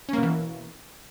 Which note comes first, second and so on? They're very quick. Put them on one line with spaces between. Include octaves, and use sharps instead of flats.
C#4 A#3 B2 E3